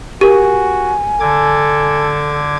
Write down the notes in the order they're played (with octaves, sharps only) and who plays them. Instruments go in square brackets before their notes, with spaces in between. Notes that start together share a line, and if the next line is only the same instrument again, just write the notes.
[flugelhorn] F#4 [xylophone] G4 A#4 [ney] G#5
[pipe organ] D3 D6 G#6 [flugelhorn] A4